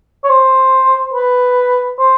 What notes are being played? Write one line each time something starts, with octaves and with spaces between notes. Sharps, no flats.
C#5
C5
B4
C5